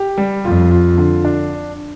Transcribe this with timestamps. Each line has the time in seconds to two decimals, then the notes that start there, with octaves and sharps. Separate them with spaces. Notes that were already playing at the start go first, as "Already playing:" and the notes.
Already playing: G4
0.18 G3
0.44 F2 F4
0.71 F4
0.98 D3
1.25 D4